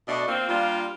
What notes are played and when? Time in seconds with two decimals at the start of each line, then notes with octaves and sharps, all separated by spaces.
0.08 B2 A3 D4 F#4 D5 D#5
0.28 A#3 C4 F4
0.49 G3 A#3 D4 F4